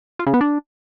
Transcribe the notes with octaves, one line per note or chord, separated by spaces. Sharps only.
F4
C#3
B3
D4